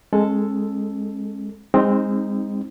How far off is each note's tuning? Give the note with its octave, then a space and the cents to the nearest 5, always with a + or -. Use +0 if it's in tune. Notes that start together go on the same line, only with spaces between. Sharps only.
G#3 +0 C#4 -40 A4 +0
G#3 -25 C4 +10 D#4 +0